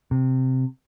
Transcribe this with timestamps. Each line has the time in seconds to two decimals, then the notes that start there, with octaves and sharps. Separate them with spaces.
0.11 C3